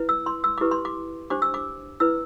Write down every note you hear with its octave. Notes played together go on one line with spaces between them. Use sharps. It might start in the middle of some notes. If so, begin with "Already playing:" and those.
Already playing: E4 B4
E6
C6
E6
E4 G4 B4 D6
C6
D6
D4 G4 C5 D6
E6
D6
E4 B4 E6